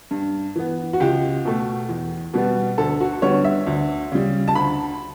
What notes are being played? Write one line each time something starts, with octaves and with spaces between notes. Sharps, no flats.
G2
E3 B3
F#4
C#2 G4
B2 A3
E2
B2 G3 B3
D2 A4
F#4
D3 G3 B3 C#5
E5
D2
C#3 G3
A5
D2 B5